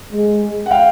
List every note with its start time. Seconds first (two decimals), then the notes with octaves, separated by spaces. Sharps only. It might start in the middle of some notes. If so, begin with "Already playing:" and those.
0.12 G#3
0.66 F#5
0.71 F5 G5